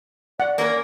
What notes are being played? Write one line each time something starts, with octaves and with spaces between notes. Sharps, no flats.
D5 F#5
A#3 C#4 A#4